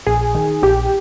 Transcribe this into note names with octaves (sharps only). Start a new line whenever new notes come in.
A#1 G#4
D#3
A#1 G4